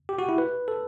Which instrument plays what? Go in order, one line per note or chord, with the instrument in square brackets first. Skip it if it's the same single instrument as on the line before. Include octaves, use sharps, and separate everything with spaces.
[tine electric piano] G4
F#4
E4
B4
A4